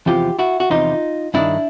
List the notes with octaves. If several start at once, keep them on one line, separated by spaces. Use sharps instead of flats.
E2 C3 F3 F4 G4
E4 F#4
F#4
E2 C3 F3 D#4 F4
G2 D#3 D4 E4